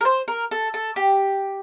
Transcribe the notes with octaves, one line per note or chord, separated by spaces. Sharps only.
A#4
C5
A#4
A4
A4
G4